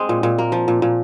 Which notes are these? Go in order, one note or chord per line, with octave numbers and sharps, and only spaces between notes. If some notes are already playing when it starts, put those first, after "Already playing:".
Already playing: G#3 C4
A#2
A#2
A#3
F3
A#2
A#2